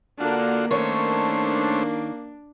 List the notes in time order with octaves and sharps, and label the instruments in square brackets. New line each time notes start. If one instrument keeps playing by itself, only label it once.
[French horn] D3 [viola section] A#3 D4 [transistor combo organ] F4 F#4
[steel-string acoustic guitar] D#3 C#5 [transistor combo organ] A3 C#4 C5 [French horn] A#3 [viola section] D4